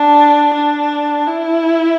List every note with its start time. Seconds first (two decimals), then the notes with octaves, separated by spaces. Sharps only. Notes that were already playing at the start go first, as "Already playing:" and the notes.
Already playing: D4
0.54 D4
1.27 E4